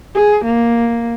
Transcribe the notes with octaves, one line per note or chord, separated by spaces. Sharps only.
G#4
A#3